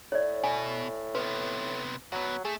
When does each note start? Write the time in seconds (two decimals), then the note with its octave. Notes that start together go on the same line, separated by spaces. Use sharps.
0.12 A2 C#5 D5
0.44 B2 G#5
1.15 C3 B3 B4
2.12 F#2 F#3 B3
2.45 A3 G#4